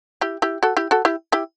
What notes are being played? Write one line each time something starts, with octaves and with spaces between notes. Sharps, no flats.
E4 G4
E4 G4
F#4 A4
E4 G4
F#4 A4
E4 G4
E4 G4